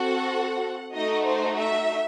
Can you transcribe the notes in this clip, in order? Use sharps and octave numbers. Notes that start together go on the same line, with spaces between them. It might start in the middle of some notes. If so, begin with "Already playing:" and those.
Already playing: C4 F#4 A4 F#5
A3 D#4 F#4 D#5
C5
E5